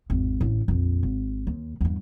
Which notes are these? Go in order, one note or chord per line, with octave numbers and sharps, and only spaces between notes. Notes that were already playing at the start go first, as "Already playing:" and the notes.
G#1 E2
A1 D3
A#1 F2
G#1
D#2
E2 G2